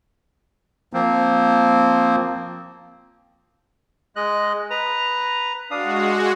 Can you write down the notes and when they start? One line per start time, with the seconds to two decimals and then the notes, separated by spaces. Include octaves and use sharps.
0.93 F3 A#3 C4
4.16 G#3 D#5 F#6
4.70 B4 A#5
5.71 G#3 D4 F#4 F5 D#6